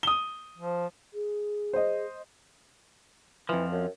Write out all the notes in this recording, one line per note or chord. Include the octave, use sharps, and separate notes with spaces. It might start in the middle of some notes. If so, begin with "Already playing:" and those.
D#6 G7
F3
G#4
C5 D#5
F2 E3 F3
F#2